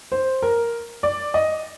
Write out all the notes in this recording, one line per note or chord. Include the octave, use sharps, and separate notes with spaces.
C5
A#4
D5
D#5